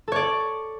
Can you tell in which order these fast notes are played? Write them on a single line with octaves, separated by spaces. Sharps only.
A4 C#5 D5